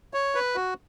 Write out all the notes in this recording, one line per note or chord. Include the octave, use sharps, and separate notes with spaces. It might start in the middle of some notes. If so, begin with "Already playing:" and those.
C#5
B4
F#4